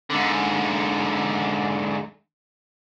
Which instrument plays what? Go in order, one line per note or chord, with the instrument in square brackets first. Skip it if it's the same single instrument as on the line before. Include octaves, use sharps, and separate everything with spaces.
[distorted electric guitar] G#2 D3